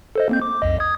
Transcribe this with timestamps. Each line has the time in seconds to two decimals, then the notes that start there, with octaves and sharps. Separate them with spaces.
0.16 A4 C5 D#5
0.29 A#3 C4 G6
0.42 D6
0.62 B1 F2 D#5
0.80 D#6 G#6